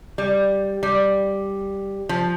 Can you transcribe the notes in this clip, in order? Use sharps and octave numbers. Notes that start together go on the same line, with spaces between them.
G3
G3
F3